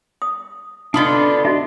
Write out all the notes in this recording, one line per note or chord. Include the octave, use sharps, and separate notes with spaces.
D#6
D3 B3 D4 F4 D#5 B5 C6 D#6
D4 F#4 D#5 E5